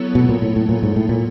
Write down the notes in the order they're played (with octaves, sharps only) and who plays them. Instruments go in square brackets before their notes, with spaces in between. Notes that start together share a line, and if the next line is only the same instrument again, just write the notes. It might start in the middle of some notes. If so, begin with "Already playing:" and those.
Already playing: [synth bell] F#3 B3 E4 A4 C#5
[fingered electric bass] B2
A#2
A2
A2
A#2
G#2
A2
A#2